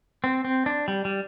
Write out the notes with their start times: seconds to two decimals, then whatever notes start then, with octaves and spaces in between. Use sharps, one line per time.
0.24 C4
0.45 C4
0.66 D4
0.88 G3
1.05 G3